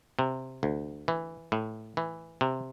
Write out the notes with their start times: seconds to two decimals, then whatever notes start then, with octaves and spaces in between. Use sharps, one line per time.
0.19 C3
0.63 D2
1.08 E3
1.52 A2
1.97 E3
2.41 C3